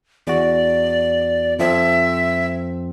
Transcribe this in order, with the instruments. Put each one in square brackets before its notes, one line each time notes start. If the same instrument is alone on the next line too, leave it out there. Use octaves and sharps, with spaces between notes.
[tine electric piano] E2 F#4 [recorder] D5
[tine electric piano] F2 F3 C4 [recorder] E5